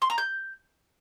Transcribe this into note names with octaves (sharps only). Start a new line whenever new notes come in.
C6
A#5
G6